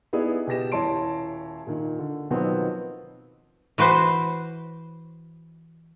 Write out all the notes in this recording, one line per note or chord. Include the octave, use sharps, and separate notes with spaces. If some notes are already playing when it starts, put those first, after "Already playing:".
B3 D#4 E4 G#4 D5 E5
B2 G4 A#6 E7
D#1 E4 C#5 A5 C6 D7
A#2 D#3
D3
B2 D#3 F3 F#3 B3 C4
E3 F#4 B4 C5